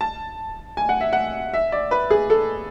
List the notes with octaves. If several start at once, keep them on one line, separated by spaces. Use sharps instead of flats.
A5
G#5
F#5
E5
F#5
E5
D5
B4
G#4
A4